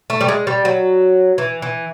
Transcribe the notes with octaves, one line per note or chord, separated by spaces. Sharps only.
A3
G3
G#3
G3
F#3
E3
E3